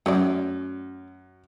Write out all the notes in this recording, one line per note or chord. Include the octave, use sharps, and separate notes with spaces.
F#2 A3 C#4 D5